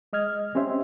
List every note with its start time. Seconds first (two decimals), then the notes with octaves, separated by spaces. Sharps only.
0.13 G#3 D#5 F6 G#6
0.55 C4 C#4 G4 C5 E5